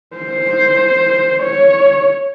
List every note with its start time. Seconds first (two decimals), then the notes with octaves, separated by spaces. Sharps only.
0.16 C5
1.43 C#5